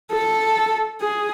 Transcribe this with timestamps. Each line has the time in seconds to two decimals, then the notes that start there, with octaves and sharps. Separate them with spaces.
0.12 A4
1.01 G#4